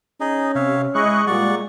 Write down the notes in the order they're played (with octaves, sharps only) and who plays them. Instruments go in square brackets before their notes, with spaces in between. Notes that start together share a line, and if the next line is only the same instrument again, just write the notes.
[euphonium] C#4 [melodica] D#4 G#4 D#5
[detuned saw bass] C3 [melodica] C#5 E5 F5
[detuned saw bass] G#3 [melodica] E4 G#4 [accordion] D#5 C#6 F#6
[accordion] A#2 [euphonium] G3 [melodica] D5 F#5 C#6